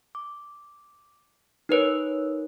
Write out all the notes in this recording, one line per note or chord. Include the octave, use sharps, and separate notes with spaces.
D6
D#4 A#4 B4 C#5